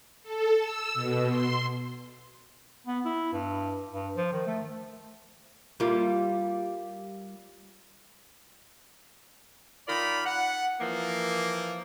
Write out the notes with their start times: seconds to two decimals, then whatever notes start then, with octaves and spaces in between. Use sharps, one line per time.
0.23 A4
0.56 E6
0.94 B2
1.28 C6
2.87 B3
3.05 E4
3.33 G2
3.93 G2
4.17 F3
4.33 D#3
4.47 A3
5.80 G3 A#3 F4
9.88 D#3 F4 A#4 D5 B5
10.26 F#5
10.81 E3 F3 A#3